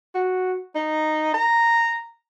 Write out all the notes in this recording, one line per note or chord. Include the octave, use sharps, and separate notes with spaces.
F#4
D#4
A#5